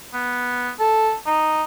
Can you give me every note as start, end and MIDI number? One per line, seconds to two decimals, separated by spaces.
0.14 0.70 59
0.79 1.14 69
1.26 1.63 63